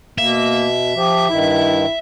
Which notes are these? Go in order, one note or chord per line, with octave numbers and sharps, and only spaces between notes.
B2 A#3 E5
F3 G4
G2 D#3 E4